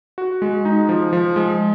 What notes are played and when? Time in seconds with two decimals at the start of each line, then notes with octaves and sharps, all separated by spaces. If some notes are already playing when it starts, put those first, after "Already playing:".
0.18 F#4
0.42 G#3
0.65 D#4
0.89 F3
1.13 F3
1.36 G#3